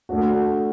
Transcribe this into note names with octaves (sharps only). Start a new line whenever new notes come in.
A3 D4 F#4